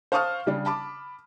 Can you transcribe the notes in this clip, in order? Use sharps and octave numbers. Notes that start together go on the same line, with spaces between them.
C5 F5 A5 C#6 D#6 F6
C#3 G3 D4
A5 B5 D6